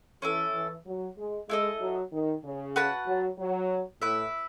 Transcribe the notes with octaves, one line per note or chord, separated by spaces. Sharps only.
E3 C#4 E4 A4
E3
F#3
G#3
G#3 E4 A4 D#5
F#3
D#3
C#3
F#4 B4 F#5 A5
F#3
F#3
A2 E4 B4 E5